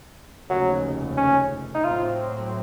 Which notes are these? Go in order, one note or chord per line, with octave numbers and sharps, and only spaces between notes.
F1 D#2 C#3 F#3
C#4
D#4
A2 F#3 C4 F4